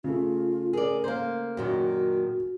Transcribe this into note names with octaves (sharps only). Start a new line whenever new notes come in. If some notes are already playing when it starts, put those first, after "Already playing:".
C#3 A3 F4
G#4 A#4 D5
A#3 C5
F#2 A#2 D#3 F#4